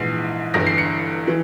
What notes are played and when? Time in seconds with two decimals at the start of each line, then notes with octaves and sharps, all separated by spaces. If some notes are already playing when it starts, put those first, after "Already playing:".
Already playing: A#1 G#2 E3 C7
0.54 G1 G2 E3 A#6
0.66 C7
0.78 C#7
1.27 E3